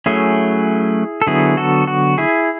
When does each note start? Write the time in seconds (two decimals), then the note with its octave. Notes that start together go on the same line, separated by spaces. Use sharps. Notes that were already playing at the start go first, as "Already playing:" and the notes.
0.06 F#3 A3 C#4 E4 G#4
1.22 A4
1.27 D3 F#3 B3 E4 G#4
1.57 F#4 A4
1.87 F#4
2.18 E4 G#4